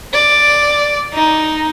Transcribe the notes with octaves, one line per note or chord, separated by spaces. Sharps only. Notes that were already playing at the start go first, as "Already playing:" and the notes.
D5
D#4